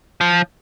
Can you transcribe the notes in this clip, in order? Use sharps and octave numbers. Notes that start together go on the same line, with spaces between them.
F3